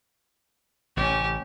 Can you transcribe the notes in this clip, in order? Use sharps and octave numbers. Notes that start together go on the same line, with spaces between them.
A1 C3 C#4 G4